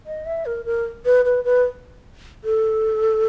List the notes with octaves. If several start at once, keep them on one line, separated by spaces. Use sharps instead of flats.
D#5
E5
A#4
A#4
B4
B4
B4
A4